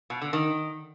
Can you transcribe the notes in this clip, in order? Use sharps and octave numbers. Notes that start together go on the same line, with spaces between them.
B2
D3
D#3